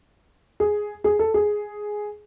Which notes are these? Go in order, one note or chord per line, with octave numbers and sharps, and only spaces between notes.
G#4
G#4
A4
G#4